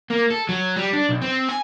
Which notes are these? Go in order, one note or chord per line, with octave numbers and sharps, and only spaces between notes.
A#3
A4
F#3
G3
D4
B1
C4
G#5